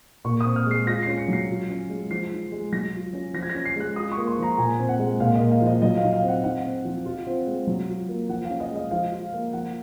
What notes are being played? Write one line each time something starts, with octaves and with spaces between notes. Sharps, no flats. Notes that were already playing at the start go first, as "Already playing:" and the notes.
A#2 C#6
C4 D#6
F6
G#3 C7
F4 A#6
C#4 C7
C#7
F#3 C7
F4
C#4
G#3
F3 C7
D#4
G#3
F#3 A#6
F4
C#4
F3 A#6
G#6
A#6
C#4
C7
G#3 F#6
F4 D#6
C#6
A#3
C6
F3 A#5
A#2 G#5
C4
F#5
G#3
A#2 F5
D#5
A#3
F5
F3
D#5
F#3 D#5
F5
D#4
F5
C4
F#5
D#4 F#5
C4
F3
F4
C4
G#3
F#3
F4
A#3
F3 F#5
C#4 F5
D#5
G#3 D#5
F3 F5
F4
A#3
F3 F#5